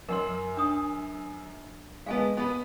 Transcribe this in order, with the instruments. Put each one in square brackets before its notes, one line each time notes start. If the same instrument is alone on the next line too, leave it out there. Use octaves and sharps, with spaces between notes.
[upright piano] F#2 [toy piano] A#4 F#5 C6
[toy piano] D4 D#6
[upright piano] G#3 B3 [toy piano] F5 G#5 A5
[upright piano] B3 B4